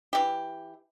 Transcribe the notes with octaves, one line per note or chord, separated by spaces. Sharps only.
E3 G4